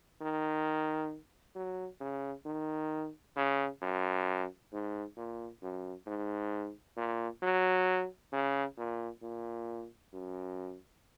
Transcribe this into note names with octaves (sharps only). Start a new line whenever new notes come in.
D#3
F#3
C#3
D#3
C#3
F#2
G#2
A#2
F#2
G#2
A#2
F#3
C#3
A#2
A#2
F#2